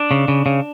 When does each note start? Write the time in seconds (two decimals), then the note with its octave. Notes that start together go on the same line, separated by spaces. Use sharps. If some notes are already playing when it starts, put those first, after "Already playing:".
Already playing: D4
0.11 C#3
0.28 C#3
0.46 C#3